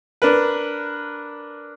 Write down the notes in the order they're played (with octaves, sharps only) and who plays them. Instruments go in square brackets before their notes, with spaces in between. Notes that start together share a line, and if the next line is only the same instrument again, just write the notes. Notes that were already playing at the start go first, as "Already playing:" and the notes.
[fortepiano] D4 A#4 B4